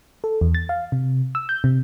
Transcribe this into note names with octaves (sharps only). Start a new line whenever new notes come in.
A4
E2
A6
F5
C3
E6
G6
C3